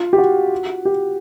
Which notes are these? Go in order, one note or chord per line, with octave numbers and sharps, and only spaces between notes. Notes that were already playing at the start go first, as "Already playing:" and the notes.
Already playing: F4
G4
F#4
G4